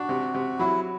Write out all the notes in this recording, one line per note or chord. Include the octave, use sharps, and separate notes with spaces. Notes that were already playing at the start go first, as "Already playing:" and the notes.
Already playing: D4 F#4
C3
C3
F#3 E4